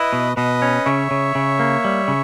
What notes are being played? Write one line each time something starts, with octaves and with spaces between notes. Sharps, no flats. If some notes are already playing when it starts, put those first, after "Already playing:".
Already playing: E4 B4 D#5
B2
B2 B4 D#5
C#4
C#3 C#5 E5
C#3
C#3
A#3
G3
C#3